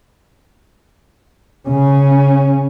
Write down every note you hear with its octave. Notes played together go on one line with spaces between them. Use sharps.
C#3 C#4